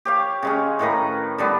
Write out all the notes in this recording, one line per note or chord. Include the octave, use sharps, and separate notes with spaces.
G4 C#5 F5
C#3 G#3 C#4
A2 D#3 B4 A#5
D3 G3 B3